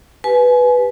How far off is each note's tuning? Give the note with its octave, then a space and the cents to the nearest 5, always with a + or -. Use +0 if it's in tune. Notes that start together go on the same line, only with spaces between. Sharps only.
G4 +0 B4 +0 G#5 +30